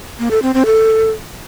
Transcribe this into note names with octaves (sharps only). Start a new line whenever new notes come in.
A#3
A4
C4
C4
A4